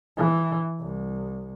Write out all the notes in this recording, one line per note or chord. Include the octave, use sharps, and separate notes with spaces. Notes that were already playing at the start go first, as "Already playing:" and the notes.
E3
C2